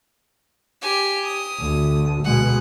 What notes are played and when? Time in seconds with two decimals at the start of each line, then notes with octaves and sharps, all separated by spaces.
0.82 G4 G#5
1.26 D#6
1.60 D2
2.24 B2 G#3 F#5